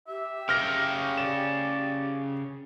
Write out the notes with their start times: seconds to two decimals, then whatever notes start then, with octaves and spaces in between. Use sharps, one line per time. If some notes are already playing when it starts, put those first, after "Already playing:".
0.08 G4 E5
0.49 C#3 G5 F6 A#6
1.18 D5 E7